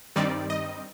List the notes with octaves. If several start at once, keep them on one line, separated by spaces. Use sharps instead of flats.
G2 D#3 G3 C4 D#4 D5
D#5